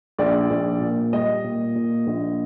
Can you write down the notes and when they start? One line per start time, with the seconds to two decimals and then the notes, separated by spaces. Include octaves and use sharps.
0.19 A#1 D5
0.51 A#1
0.81 A#2
1.13 G3 D#5
1.44 A#2
1.76 A#2
2.07 A#1